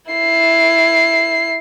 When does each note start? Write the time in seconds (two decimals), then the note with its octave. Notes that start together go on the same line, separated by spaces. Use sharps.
0.12 E4 C7